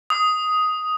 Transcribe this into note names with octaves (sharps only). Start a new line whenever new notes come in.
D#6